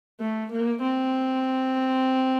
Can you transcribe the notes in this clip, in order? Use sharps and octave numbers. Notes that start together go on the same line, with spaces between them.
A3
A#3
C4